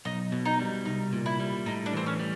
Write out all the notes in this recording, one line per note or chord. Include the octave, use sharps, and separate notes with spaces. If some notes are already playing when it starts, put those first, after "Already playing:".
B1 D#4
B2
D#4
G3
C2 D#4
A#2
E4
G3
A2 D#4
D4
E3 C4
C#4
G3